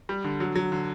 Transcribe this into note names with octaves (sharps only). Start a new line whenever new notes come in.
G3
D3
F#3
F#3
D3